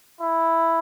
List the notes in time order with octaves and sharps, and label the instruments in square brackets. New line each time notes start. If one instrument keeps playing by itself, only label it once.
[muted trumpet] E4